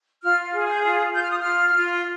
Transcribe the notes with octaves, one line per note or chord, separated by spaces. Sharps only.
F4 F6
G#4
G6
F4
F4 G6
F6
D#6
F4 F6
F4